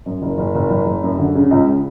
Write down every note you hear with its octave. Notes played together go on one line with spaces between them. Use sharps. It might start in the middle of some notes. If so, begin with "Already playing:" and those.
F#2
F#1
F#1
F#1
F#1
F#1
F#2
D3
C#3
C#2